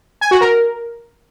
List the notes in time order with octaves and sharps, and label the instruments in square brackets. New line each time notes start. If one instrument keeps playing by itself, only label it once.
[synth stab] G#5
F#4
A#4